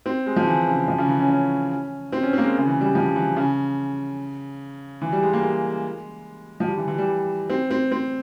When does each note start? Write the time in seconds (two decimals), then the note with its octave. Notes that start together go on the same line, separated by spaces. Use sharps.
0.06 C4
0.26 G#3
0.36 F3
0.47 E3
0.67 C#3
0.88 F3
0.98 C#3
1.08 E3
1.19 C#4
1.29 C#4
2.12 C4
2.23 C#4
2.33 A#3 C4
2.43 G#3
2.58 C#3
2.67 E3
2.81 G3
2.95 F3
3.16 E3
3.36 C#3
5.02 E3
5.12 G3
5.23 G#3
5.33 A#3
5.43 G#3
6.60 F3
6.68 G3
6.77 E3
6.88 E3
6.98 G3
7.50 C4
7.71 C4
7.91 C4